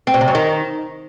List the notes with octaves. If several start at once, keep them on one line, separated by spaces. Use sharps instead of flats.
C4
B2
C3
F#2
D#3